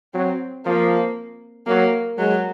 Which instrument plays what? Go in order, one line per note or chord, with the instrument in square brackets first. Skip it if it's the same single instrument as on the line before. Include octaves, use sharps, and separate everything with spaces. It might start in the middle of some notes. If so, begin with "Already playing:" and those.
[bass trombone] F#3 [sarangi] C4
[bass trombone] F3 [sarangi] A#3
[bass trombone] F#3 [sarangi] A#3
[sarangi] F#3 [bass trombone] G#3